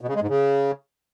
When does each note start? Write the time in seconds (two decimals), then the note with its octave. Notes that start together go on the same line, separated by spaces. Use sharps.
0.01 B2
0.08 C#3
0.15 G#3
0.22 G#2
0.29 C#3